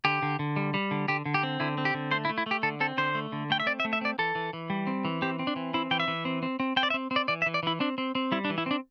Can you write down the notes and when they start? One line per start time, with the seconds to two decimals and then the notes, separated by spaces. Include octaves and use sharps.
0.05 D3 G4
0.22 D3
0.39 D3
0.56 G3
0.74 G3
0.91 D3
1.08 D3 G4
1.25 D3
1.34 G4
1.43 C4
1.60 D3 E4
1.78 C4
1.85 G4
1.94 D3
2.11 A3 C5
2.25 E4
2.29 A3
2.38 E4
2.46 A3 G4
2.63 D3 A4
2.80 C4 A4
2.98 D3 C5
3.15 A3
3.32 D3
3.50 A3 G5
3.60 E5
3.66 C4 D5
3.80 E5
3.85 A3
3.93 E5
4.01 C4 D5
4.19 E3 A4
4.35 E3
4.53 E3
4.70 G3
4.87 C4
5.05 E3
5.22 C4 G4
5.39 C4
5.47 D4
5.56 E3
5.74 C4 E4
5.91 E3 G5
6.00 E5
6.08 E3
6.25 C4
6.43 C4
6.60 C4
6.76 C4 G5
6.83 D5
6.90 E5
6.94 C4
7.11 C4
7.16 D5
7.28 E3 D5
7.42 E5
7.46 E3
7.54 D5
7.63 E3 E4
7.80 C4 D4
7.98 C4
8.15 C4
8.32 G3 E4
8.45 D4
8.50 E3
8.58 E4
8.66 C4 D4